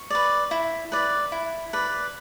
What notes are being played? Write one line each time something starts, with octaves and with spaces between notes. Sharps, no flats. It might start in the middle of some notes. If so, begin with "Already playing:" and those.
Already playing: C#6
B4 D5
E4
B4 D5
E4
B4 D5